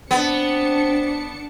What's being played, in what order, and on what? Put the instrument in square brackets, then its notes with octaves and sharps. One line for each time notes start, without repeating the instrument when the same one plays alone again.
[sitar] B3 [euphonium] C4 [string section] D4 C#7